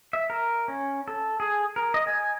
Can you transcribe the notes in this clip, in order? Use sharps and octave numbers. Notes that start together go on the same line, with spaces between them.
E5
A#4
C#4
A4
G#4
A#4
D#5
G#5